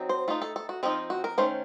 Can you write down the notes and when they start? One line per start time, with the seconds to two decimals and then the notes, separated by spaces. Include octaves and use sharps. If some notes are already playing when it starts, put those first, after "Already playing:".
Already playing: F#3 C4 D#4
0.09 C5
0.28 A3 D#4 F4
0.42 A4
0.56 A4
0.69 F#4
0.83 F3 C4 D#4 F4
1.10 F#4
1.24 A#4
1.38 D#3 A3 C#4 C5